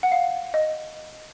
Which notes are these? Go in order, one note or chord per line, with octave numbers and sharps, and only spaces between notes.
F#5
F5
D#5